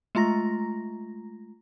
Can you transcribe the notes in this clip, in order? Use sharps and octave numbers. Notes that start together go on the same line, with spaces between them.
G#3 A3 F4 A#5 A#6